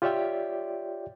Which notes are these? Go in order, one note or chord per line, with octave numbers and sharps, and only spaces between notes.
F4 G4 C#5 D5 E5 G5